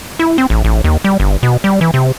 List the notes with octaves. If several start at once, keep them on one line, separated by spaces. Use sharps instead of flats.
E4
C4
A1
A1
D#2
G3
G1
B2
G3
E3
C3